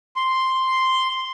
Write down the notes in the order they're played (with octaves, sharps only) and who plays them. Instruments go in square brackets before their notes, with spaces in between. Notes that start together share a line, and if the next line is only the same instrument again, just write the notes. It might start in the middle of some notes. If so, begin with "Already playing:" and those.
[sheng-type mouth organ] C6